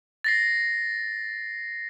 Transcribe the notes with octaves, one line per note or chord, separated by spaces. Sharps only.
A6 A#6 C7